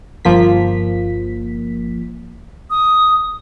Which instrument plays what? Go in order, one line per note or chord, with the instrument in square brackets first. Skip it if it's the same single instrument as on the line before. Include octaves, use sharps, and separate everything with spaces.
[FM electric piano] G1 F3 A#3 B6
[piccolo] D#6